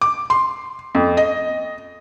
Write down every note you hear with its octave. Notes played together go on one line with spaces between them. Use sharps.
D6
C6
F2
D#5